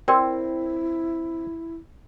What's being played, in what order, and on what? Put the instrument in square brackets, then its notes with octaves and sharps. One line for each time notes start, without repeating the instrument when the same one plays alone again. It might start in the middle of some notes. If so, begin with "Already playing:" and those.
[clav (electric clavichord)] C4 [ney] E4 [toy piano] A#4 D5 G5